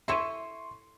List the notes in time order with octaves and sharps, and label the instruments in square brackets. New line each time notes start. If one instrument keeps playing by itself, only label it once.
[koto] E4 A4 C#5 [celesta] E5 D#7 [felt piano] C6 C#6